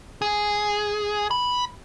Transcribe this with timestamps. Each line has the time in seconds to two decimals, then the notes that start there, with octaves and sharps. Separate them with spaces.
0.22 G#4
1.31 B5